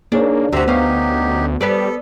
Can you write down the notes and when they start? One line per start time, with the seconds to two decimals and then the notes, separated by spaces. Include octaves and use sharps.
0.12 A#3 D4 D#4 G#4 C#5
0.53 D2 C3 C4 F#4 E5 A#5
0.68 F#3 B3 C#4 D#4 G4 F5
1.61 G3 B3 A4 B4 D5